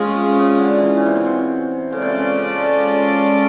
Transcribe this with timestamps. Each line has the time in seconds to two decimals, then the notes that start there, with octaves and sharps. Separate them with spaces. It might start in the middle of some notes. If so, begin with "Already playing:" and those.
Already playing: C3 G#3 C#4 F4 G#4
0.39 C#3
0.58 D3
0.78 E3
0.97 C#3
1.06 C3
1.16 B2
1.25 C3
1.92 C#3 G#3 C#4 F4 A4 D5
2.02 C3
2.12 C#3